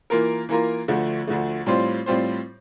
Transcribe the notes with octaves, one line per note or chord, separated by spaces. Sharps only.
E3 A#3 F4 A#4
E3 A#3 F4 A#4
D2 D3 F3 A3
D2 D3 F3 A3
A2 G3 C4 F4 C5
A2 G3 C4 F4 C5